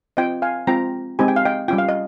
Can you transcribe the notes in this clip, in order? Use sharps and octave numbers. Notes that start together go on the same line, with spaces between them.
C4 F4 D#5 G5
F5 G#5
G#3 C4 F4 G5 A#5
G#3 C4 D#4 G4 G#5
G5
F5
D#5 G5
G3 C#4 F4 G5
F5
D#5